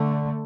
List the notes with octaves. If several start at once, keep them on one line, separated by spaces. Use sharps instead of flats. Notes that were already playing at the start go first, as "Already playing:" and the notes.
Already playing: D3 A3